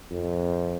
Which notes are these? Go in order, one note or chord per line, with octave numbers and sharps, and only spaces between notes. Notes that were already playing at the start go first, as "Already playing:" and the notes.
F2